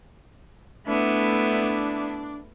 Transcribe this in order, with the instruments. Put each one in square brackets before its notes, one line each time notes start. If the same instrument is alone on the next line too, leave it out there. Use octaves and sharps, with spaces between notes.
[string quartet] A3 B3 E4 [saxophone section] D4